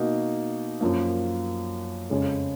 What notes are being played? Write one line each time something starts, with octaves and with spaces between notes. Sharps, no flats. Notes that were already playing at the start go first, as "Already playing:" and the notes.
Already playing: B2 A#3 D#4 F#4
F#2 F3 A#3
F2 C#3 G#3 C#4